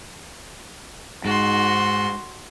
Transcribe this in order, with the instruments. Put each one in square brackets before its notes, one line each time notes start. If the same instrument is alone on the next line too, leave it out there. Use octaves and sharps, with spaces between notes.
[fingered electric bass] G#2 [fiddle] F#4 C6